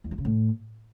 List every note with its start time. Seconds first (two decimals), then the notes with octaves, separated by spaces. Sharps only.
0.04 E2
0.11 F3
0.18 C#3
0.25 A2